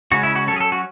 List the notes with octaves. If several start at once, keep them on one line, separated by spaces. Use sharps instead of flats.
C#3 G#3 C#4 F#4
E4
F#4
F#3 C#4 A4
G#4
A4
F#4